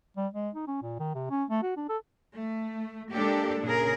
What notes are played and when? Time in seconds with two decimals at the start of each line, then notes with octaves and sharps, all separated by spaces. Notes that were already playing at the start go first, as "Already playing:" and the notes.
0.17 G3
0.34 G#3
0.55 D#4
0.67 C#4
0.82 A#2
0.99 D#3
1.15 C3
1.30 C#4
1.50 A3
1.63 F#4
1.76 D4
1.89 A4
2.35 A3
3.12 G#3 A#3 D4 G4 A4
3.63 A#2 C#3 G#4 A#4